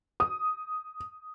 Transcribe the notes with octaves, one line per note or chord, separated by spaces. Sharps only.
D#6